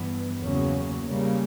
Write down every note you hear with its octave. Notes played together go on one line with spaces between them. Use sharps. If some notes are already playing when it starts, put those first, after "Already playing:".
Already playing: G2 E3 B3
E2 C#3 F#3 A#3 C#4
C#3 G3 A#3